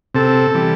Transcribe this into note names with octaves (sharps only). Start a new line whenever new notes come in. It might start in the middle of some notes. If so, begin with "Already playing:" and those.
C3 A4
E3 G3